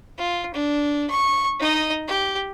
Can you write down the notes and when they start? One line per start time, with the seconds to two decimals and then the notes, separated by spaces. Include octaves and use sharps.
0.18 F4
0.54 D4
1.10 C#6
1.60 D#4 D#5
2.08 G4